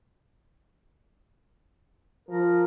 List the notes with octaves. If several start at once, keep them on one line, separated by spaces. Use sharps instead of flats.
F3 A#4